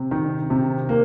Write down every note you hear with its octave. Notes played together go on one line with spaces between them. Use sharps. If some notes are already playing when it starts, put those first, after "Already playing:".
Already playing: C3
D#3
C3
A#3